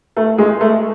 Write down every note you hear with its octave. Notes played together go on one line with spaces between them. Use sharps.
A3
G#3
A3